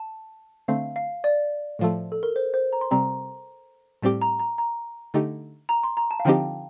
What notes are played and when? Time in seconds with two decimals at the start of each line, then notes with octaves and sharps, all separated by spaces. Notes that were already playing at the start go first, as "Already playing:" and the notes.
Already playing: A5
0.68 D3 A3 C4 F5
0.96 F5
1.24 D5
1.79 A2 F3 A3
2.12 A4
2.23 A#4
2.36 C5
2.54 C5
2.73 A#5
2.81 C6
2.91 C3 G3 C4 A#5
4.02 A2 G3 C4 G4
4.22 A#5
4.39 A#5
4.58 A#5
5.14 D3 A3 D#4 G4
5.69 A#5
5.83 C6
5.97 A#5
6.11 A5
6.20 F5
6.25 D3 F3 C4 D#4 G4 G5